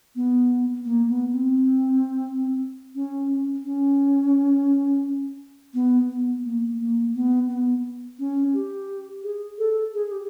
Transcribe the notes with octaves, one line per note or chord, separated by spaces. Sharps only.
B3
A#3
B3
C4
C#4
C#4
B3
B3
A#3
A#3
B3
B3
C#4
G4
G#4
A4
G#4
G4